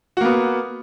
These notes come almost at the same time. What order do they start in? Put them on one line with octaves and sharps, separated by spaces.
F#4 A#3 B3